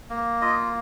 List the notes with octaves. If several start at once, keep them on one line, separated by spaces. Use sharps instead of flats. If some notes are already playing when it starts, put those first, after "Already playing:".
A#3
F4 D#5